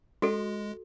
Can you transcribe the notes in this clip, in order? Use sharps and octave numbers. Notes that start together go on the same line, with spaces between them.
G#3 F#4 A4